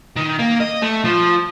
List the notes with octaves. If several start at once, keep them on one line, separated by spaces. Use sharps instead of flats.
D#3
A#3
D#5
A3
F3